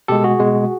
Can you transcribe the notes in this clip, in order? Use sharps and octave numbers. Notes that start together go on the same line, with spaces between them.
B2 G#3 G4 A4
F#4 G#4
B2 G#3